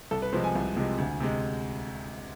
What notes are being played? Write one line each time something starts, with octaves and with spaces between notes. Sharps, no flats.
C2 A4
B4
C3 F3 G#3 C5
G#5
C2
C3 F3 G#3
D2
C3 G#3